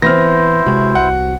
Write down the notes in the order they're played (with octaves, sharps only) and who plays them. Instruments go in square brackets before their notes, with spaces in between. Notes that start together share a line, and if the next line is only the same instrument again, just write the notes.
[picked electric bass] E3 [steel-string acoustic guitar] B3 C4 [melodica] E4 C5 [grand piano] F6 A#6
[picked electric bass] C3 G#3 [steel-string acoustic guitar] F#4
[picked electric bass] C2 [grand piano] F#5